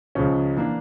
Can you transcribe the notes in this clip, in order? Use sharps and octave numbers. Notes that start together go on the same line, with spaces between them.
C#2 C#3 F3 C#4
E3 A#3 D4